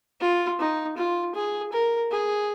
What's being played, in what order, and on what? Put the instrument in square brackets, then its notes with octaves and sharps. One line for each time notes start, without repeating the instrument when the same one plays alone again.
[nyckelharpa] F4
D#4
F4
G#4
A#4
G#4